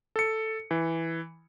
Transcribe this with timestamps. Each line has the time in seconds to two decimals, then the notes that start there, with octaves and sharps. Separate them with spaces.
0.16 A4 C#7
0.71 E3